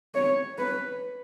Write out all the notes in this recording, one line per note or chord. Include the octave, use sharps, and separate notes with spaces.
C#5
B4